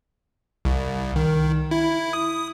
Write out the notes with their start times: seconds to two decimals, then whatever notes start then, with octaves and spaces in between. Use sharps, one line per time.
0.65 C2
1.16 D#3
1.71 E4
2.13 D#6